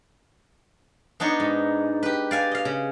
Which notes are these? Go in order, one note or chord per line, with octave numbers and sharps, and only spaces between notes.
B3 D4 D#4 C#5
G#2
G4 B4
D5 F5 G#5
D#5 F5
C#3